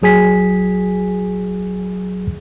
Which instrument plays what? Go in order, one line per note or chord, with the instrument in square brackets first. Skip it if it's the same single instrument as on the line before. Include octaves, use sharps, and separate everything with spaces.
[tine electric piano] A#1 F#3 G#4 G#5 B6